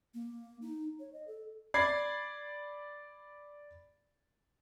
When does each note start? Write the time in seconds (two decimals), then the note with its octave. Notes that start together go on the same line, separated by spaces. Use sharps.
0.14 A#3
0.62 D#4
1.00 C#5
1.13 D#5
1.27 A4
1.74 D5 B5 G#6 C7